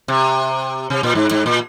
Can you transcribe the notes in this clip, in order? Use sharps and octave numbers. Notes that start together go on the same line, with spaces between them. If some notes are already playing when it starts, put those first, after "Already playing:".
C3
C3
A#2
G#2
G#2
A#2